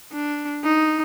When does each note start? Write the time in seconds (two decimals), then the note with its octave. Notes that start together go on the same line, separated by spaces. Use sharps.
0.13 D4
0.64 D#4